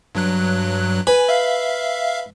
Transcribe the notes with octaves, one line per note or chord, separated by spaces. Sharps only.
G2 F#3 F#6
B4 G#5
E5 F5